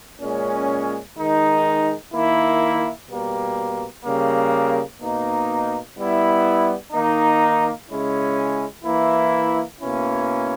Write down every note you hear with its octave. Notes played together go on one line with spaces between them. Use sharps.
A#2 G#3 C#4
D#3 G#3 D#4
D#3 A#3 E4
B2 G3 A#3
C#3 G3 A#3
B2 A#3 D#4
G3 B3 E4
D#3 A#3 D#4
C#3 G#3 C#4 E4
E3 A#3 E4
B2 A#3 C#4 E4